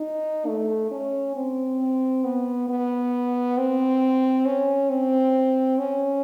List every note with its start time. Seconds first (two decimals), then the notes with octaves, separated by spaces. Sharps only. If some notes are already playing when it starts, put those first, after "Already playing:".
Already playing: D#4
0.47 A3
0.91 C#4
1.36 C4
2.24 B3
2.69 B3
3.58 C4
4.46 C#4
4.90 C4
5.78 C#4